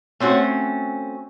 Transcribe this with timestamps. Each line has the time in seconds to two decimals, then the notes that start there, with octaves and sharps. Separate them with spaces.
0.20 A3 C4 C#4 F#4